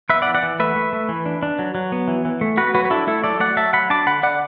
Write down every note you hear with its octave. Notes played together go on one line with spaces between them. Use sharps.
B3 B4 E5
D5 F#5
E3
D5 F#5
E3
A3 B4 E5
A3
A3
E3
D4
D4
F#3
F#3
B3
E3
E3
A3
B3 F#4 B4
F#3 F#4 B4
B4
D4 E4 A4
A3 E4 A4
F#3 A4 D5
A3 D5 F#5
F#3 E5 A5
F#3 F#5 B5
D4 A5 D6
D3 F#5 B5
D3 D5 F#5